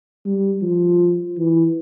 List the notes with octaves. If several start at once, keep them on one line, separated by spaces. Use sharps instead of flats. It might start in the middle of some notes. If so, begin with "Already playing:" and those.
G3
F3
E3